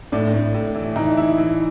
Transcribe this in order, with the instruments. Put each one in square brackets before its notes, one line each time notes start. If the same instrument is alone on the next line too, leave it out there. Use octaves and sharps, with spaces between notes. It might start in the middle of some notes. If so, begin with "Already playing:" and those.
[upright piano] A2 [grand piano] D4
[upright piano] A2
A2
E3
[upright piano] E3 [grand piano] D#4
[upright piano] E4
E3